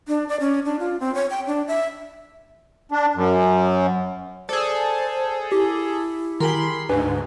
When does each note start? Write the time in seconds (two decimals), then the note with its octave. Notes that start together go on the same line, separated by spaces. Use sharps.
0.08 D4
0.29 D5
0.40 C#4
0.65 D4
0.79 F4
1.00 C4
1.15 C#5
1.30 G5
1.47 D4
1.68 E5
2.92 D4
3.15 F#2
4.49 G#4 A4 C5 D5
5.52 E4 G4
6.40 D#3 G4 G#4 A#4 B5 C6
6.89 D2 G#2 D4 G#4 B4